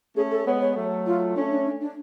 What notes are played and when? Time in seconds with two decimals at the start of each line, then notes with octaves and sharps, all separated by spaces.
0.16 A3 C#4 G#4
0.31 A4
0.46 G#3 B3 C#5
0.61 C#5
0.75 F#3 A3
1.06 F4
1.36 A3 C#4 D4
1.51 D4
1.66 D4
1.81 D4